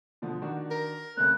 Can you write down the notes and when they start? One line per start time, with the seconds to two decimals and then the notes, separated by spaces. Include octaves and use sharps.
0.22 B2 D3 F3
0.42 D#3 D4 F#4
0.71 A#4
1.17 C#3 A3 C4 F#6